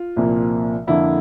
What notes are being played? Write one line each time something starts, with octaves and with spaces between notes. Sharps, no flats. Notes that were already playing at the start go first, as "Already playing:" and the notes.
Already playing: F4
C2 A#2 F3 A#3
F2 D3 F3 A#3 D4 E4